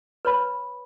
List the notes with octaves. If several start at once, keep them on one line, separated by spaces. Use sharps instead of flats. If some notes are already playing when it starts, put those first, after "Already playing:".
B4 C#5 B5